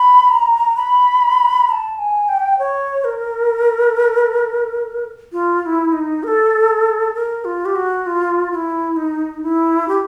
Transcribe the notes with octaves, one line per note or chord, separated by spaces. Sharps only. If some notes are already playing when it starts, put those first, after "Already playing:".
Already playing: B5
A#5
B5
A#5
A5
G#5
G5
C#5
A#4
F4
F4
E4
D#4
A#4
A4
A#4
F4
G4
F#4
F4
F4
E4
D#4
E4
G4